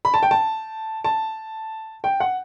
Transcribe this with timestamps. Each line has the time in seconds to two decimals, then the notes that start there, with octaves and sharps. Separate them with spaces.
0.05 B5
0.14 A5
0.23 G5
0.31 A5
1.04 A5
2.04 G5
2.20 F#5